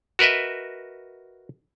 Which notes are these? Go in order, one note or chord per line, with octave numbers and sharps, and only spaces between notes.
F#4 A#4 B4 D#5 E5